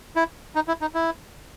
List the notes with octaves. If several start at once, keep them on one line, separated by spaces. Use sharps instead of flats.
E4
D#4
E4
D#4
E4